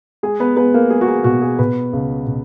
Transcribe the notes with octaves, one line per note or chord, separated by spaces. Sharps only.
G#3 G#4
B3 B4
G#3 B3 B4
A#3 A#4
G#3 G#4
F#4
G#4
B2 F#4
G#4
B2 B3 B4
C#2
B2